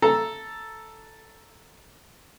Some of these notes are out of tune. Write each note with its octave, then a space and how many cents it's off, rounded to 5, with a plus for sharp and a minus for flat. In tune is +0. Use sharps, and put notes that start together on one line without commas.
A4 +0 A#5 +0